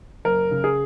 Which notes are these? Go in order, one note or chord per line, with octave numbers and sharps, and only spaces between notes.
F#1 A#4
C#3
G#4